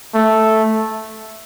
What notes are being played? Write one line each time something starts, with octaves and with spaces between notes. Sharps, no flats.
A3